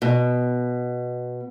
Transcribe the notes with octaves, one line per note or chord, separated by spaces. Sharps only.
B2